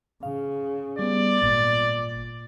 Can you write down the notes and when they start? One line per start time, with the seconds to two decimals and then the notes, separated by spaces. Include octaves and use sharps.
0.23 C#3 F5
0.99 G3 B3 D5
1.38 G#1 A#2 A6